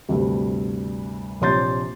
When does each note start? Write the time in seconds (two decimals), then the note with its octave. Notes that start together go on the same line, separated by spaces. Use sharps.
0.09 D2 G2 C3
1.41 A#1 C3 C#5 C6 G6 A6